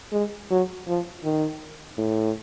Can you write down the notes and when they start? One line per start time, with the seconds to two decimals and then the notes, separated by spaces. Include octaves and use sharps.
0.13 G#3
0.51 F#3
0.87 F3
1.24 D#3
1.98 A2